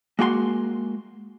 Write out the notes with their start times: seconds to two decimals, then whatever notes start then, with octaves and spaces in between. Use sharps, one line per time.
0.19 G#3 A#3 F#4 G5 C6